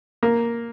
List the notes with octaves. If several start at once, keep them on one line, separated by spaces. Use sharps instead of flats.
A#3